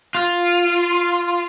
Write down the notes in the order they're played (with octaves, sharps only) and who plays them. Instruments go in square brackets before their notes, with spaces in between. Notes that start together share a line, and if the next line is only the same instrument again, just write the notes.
[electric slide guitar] F4